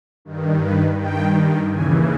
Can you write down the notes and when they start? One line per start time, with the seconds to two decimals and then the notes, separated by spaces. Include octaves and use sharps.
0.25 G2 D#3
0.61 B4
0.99 G2 D#3 G5
1.71 D#2 C#3 E3 G#5